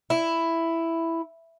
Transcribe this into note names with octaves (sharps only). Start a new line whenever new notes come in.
E4